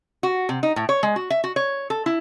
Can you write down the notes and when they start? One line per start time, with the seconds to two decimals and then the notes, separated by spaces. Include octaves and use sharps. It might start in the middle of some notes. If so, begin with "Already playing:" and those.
0.23 F#4
0.49 C3
0.63 D#4
0.76 A2
0.89 C#5
1.03 G#3
1.16 F#4
1.30 E5
1.44 F#4
1.56 C#5
1.90 A4
2.06 E4